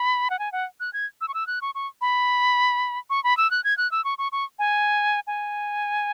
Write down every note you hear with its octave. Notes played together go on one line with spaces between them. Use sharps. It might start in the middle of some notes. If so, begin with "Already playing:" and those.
Already playing: B5
F#5
G#5
F#5
F#6
G#6
E6
C#6
E6
F#6
C#6
C#6
B5
C#6
B5
E6
F#6
G#6
F#6
E6
C#6
C#6
C#6
G#5
G#5